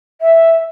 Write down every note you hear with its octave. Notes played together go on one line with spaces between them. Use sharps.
E5